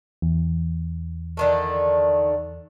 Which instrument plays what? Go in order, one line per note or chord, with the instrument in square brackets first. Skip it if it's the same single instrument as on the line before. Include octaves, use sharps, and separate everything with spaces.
[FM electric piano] E2
[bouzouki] D3 D#3 A3